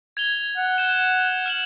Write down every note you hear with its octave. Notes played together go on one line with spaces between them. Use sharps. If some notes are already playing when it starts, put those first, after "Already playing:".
G#6 F7 G7
F#5
G6 E7
F6 E7 F#7